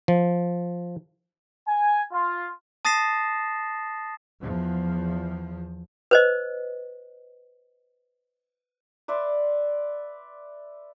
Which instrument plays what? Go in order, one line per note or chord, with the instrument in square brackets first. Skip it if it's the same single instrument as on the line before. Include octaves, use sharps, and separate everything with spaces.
[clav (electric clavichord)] F3
[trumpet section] G#5
F4
[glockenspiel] A5 D#6 A6 A#6 C7 E7
[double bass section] E2 F3
[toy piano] B4 C5 D#5
[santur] B4 D5 E5 C6